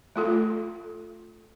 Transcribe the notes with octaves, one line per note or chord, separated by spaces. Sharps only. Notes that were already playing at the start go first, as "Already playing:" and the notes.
A3 F4 A4